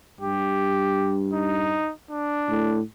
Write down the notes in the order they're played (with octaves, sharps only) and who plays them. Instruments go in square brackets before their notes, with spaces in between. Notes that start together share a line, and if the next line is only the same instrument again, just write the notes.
[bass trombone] G2 [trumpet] G4
[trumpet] D#4
D4
[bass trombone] A2